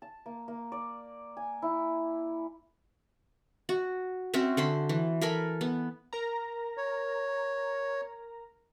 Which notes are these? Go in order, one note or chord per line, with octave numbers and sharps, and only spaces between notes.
A5
A#3
A#3
D5
G#5
E4
F#4
C4 C#4 F#4 E5
D3 C5 B5
E3
A4 A#4 G#5 B5
B3
A#4 A#5
C#5